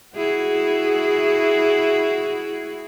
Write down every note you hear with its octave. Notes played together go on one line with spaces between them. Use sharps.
E4 F#4 G#4